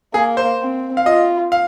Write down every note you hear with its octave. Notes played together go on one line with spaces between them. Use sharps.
A#3 G#4
C5
C4
F5
F4 D#5
F5